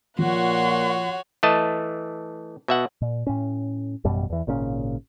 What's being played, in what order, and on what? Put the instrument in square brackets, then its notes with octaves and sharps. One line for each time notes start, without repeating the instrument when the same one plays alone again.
[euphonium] A#2 [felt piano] F3 [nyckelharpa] F#4 C#5 [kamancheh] F#5 C6
[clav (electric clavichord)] E3 A3 D#5 A5
B2 E5 F#5
[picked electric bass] A#2
A2 C#4
A1 F#2 B2 G3
E2 E3
G#1 A#2 C#3 C#4